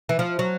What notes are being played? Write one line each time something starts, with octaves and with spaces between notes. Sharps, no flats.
E3
F3
F#3